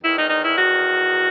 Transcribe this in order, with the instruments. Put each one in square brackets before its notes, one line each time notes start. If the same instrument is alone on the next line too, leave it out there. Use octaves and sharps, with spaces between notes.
[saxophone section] E2 D#3 E4
D#4
D#4
E4
F#4